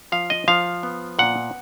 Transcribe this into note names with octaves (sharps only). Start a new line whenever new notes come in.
F3 F5
D#5
F3 F5
B3
A#2 F#5